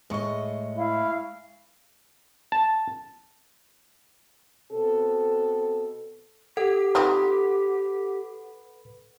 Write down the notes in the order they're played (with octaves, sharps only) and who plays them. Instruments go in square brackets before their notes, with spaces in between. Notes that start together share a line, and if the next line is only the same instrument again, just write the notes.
[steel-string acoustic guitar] A2 D#5 [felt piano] G#3 C#6
[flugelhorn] E4 [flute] F5
[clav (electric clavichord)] A5
[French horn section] B2 C4 A4
[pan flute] G4 [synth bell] A4 F#5
[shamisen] C4 D#4 F4 [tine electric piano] B4